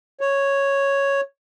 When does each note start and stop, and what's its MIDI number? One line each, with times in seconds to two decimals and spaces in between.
0.21 1.21 73